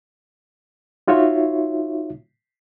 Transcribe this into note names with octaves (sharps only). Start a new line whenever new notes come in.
D#4 F4 F#4 C#5 E5